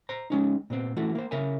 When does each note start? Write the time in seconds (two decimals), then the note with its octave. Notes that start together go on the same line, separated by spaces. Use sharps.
0.09 C5 A#5
0.30 G#3 C#4 D#4
0.70 A#2 B3 C4
0.96 E3 A3 E4 F#4
1.15 A#3 C5
1.31 C#3 A#4 E5 G#5